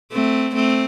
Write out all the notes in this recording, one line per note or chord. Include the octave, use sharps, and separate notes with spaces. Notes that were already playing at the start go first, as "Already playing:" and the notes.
A3 C4
A3 C4